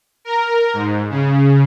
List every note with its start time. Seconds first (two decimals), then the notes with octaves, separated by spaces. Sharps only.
0.25 A#4
0.74 G#2
1.10 C#3